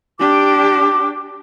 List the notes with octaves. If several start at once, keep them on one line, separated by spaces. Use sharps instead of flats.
D4 G4 D6